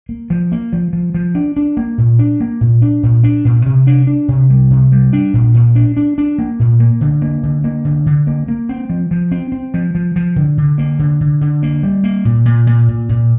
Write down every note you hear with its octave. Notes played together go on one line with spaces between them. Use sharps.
A#3
F3
A#3
F3
F3
F3
D4
D4
A#3
A#2
D4
A#3
A#2
D4
A#2
D4
A#2
C3
D4
D4
C3
G3
C3
G3
D4
A#2
A#2
D4
D4
D4
A#3
A#2
A#3
D3
A#3
D3
A#3
D3
D3
A#3
A#3
C4
F3
F3
C4
C4
F3
F3
F3
D3
D3
A#3
D3
D3
D3
A#3
G3
A#3
A#2
A#2
A#2
A#2
A#2